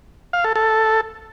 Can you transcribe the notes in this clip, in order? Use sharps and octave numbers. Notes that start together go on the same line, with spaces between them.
F5
A4
A4